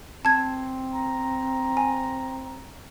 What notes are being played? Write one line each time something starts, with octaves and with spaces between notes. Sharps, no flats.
C4 A5 G#6
A#5
G#5